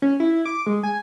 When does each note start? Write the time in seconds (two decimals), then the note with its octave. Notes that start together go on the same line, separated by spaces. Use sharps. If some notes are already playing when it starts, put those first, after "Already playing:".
0.02 C#4
0.20 E4
0.45 D6
0.66 G#3
0.83 G#5